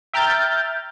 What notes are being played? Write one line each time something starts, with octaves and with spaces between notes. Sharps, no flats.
E5 G5 A#5 F6 G6 A6